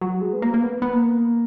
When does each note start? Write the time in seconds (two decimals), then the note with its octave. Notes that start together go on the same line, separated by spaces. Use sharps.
0.01 F#3
0.21 G#3
0.33 B3
0.42 A#3
0.54 A#3
0.62 B3
0.82 B3
0.93 A#3